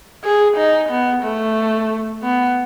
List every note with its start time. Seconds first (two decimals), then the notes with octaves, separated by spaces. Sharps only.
0.25 G#4
0.57 D#4
0.90 B3
1.24 A3
2.23 B3